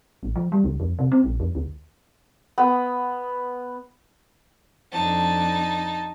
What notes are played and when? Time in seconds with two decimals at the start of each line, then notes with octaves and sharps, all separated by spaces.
0.23 A1
0.36 F3
0.52 G3
0.64 C#2
0.80 F2
0.99 C3
1.12 C4
1.24 A#1
1.40 F2
1.55 D2
2.58 B3
4.92 F2 D4 D#4 A5